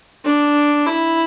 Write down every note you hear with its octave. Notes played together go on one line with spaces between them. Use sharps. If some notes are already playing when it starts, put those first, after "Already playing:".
D4
E4